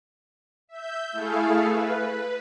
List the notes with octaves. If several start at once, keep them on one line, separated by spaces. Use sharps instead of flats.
E5 G6
A3 E4 G#4 A4 F5
B4